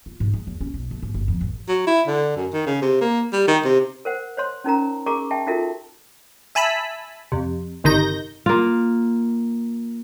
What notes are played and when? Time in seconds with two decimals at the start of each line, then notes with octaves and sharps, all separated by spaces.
0.06 F4
0.20 G#2
0.33 G#3
0.47 E2
0.61 C#4
0.74 B1
0.91 A3
1.02 G#2
1.14 G1
1.28 F2
1.41 A1
1.68 F#3
1.87 E4
2.07 D3
2.36 F#2
2.53 D#3
2.66 C#3
2.82 C3
3.01 A#3
3.33 G3
3.48 D#3
3.65 C3
4.05 A#4 C5 F#5
4.37 C5 C#5 C6
4.64 C#4 D#4 A#4 A#5
5.06 G#4 A#4 A#5 C#6 D6
5.31 E5 G5 A5
5.47 D#4 F4 F#4 A4 A#4 E5
6.55 E5 G#5 A5 B5 B6
7.32 F2 C3
7.84 G1 C3 D#3 D#4 G6 A#6
8.46 A#3 F4